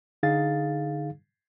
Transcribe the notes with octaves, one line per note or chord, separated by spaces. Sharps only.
D3 D#4 G#4 F5 A6